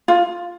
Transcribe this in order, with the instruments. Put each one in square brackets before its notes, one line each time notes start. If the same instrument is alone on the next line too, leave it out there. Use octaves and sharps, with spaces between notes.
[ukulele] F4